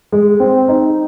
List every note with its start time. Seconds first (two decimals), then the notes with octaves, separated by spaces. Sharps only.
0.12 G#3
0.40 C4
0.68 D#4